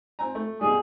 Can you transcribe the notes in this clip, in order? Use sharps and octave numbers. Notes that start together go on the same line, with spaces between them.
C4 G#5 A#5
A3
B2 G3 G#4